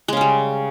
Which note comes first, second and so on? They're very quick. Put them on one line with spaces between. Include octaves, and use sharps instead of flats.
G#3 C#3 C#4 G3